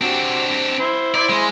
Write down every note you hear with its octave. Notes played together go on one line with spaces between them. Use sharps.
C4 D4 F#4 G4
E4 C5
E4 C5 D5
G#3